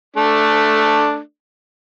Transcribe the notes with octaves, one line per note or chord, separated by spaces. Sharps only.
A3 D4